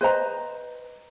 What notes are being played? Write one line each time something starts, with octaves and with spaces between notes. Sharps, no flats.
B4 C5 D#5 A#5